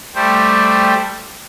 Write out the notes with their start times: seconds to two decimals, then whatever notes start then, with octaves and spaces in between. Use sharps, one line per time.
0.15 G3 A3 G4 C5